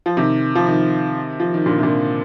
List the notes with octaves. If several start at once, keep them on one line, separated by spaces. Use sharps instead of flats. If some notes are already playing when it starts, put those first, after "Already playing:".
F3
C3 D#3
F3
C3 D#3
F3
D#3
A#2 D3
C3
A#2 D3